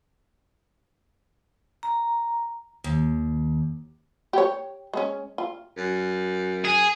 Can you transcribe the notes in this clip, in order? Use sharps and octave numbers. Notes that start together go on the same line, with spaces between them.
A#5
D#2
G4 C#5
G#3 C#4
F4
F#2
G#4